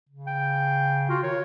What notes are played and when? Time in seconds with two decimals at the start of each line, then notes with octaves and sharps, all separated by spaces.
0.09 C#3
0.27 G5
1.09 F4 F#4
1.23 D#3 C#5